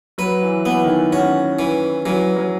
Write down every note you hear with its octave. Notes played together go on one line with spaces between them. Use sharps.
F#3 B4
E3
E3 B3
D#3
E3
C#4 F#4
E3
E3 F#3
F#3